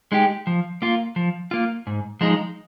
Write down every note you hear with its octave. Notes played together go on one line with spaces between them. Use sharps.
G#3 D#4 G4
F3
A#3 F4
F3
A#3 F4
G#2
F3 G#3 D#4